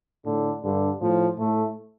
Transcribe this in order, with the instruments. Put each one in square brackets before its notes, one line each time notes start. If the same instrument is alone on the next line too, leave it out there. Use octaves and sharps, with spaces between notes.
[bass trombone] A2 [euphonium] D3
[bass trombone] G2 [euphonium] D3
[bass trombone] A2 [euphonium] F3
[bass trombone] A2 [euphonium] A3